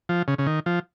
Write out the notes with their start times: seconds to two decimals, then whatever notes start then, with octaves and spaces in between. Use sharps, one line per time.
0.09 F3
0.28 C#3
0.38 C#3
0.46 D#3
0.66 F3